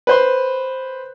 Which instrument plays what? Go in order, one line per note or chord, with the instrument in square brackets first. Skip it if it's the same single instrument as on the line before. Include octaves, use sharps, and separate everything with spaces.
[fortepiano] B4 C5 C6